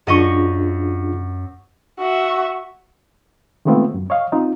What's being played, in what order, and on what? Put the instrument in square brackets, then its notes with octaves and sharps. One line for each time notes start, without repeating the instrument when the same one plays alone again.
[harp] F#2 D#5 C#6 [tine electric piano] D4 F4 G#4
[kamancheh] F#4 E5
[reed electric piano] D#3 G#3 A3 B3 C4 F4
F#2
C#5 D#5 F5
C4 D#4 F4